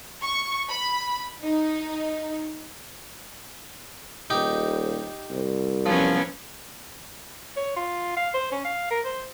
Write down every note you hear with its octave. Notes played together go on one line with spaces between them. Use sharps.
C#6
B5
D#4
D#1 D#4 G4
C2
F3 F#3 B3 C#4
C#5
F4
F5
C5
C#4
F5
A#4
C5